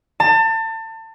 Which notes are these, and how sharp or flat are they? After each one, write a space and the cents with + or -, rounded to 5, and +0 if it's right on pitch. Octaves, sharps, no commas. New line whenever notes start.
A5 +30